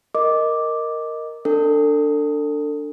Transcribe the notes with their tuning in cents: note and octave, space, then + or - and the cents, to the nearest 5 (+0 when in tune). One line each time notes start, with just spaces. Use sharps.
A#4 +0 D#5 +0 D6 +0
D4 +0 A4 +35